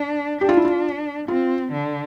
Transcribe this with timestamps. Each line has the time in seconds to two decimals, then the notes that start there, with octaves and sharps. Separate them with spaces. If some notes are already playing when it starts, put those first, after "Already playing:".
Already playing: D4
0.41 D4 G4
0.49 F4
0.57 E4
0.65 F4
1.28 C4 F4
1.72 D3